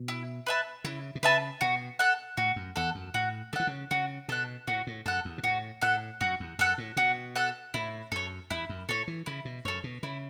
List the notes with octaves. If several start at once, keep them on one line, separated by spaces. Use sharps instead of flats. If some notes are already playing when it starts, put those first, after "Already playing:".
Already playing: B2
E4
B4 E5 A5
C#3 E4
B2
C#3 B4 E5 A5
B2 F#4
A4 F#5
A2 F#4
F#2
E2 A4 F#5
F#2
A2 F#4
C#3 E3 A4 F#5
C#3
C#3 F#4
B2 A4 F#5
A2 F#4
A2
F#2 A4 F#5
E2
B2
A2 F#4
A2 A4 F#5
F#2 F#4
E2
F#2 A4 F#5
A2
B2 F#4
A4 F#5
A2 E4
F#2 A4 C#5
E2 E4
F#2
A2 A4 C#5
E3
C#3 E4
B2
F#2 A4 C#5
B2
C#3 E4